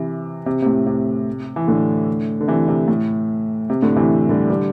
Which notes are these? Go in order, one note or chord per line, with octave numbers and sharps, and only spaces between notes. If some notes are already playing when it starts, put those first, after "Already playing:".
Already playing: C3 E3
C3
C3
A2
C3
E3
A2 D3
D3
C3 E3
C3
A2
C3
A2 D3
C3 E3
D3 G3
D3 G3